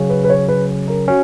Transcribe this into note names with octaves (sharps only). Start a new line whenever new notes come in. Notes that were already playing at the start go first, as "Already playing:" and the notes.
Already playing: C#3 F#3 C#4
B4
B4
C#5
B4
A#4
C#4 F#4